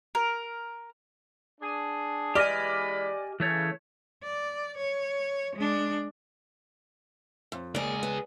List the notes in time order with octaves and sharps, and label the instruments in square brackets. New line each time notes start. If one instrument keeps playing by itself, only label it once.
[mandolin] A#4
[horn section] D4 G#4
[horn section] E3 G#3 B5 [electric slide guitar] G4 D#5 G#5 [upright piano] D5 F6
[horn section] C#3 [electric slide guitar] E3 A3 C#5
[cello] D5
C#5
G#3 D4
[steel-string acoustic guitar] F2
[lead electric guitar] C#2 G#4 [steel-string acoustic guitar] A#3 D5
[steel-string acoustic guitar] B3